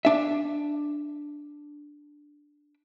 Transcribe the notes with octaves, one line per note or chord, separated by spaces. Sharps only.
D4 E5